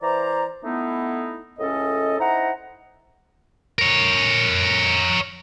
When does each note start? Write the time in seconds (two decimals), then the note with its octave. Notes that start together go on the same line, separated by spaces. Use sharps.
0.03 E3 C5 D5 A#5
0.64 A3 B3 D#4 E4
1.59 C#2 A2 C#4 A4 D#5
2.20 D#4 E4 C5 F#5 A#5
3.79 A#4 C#5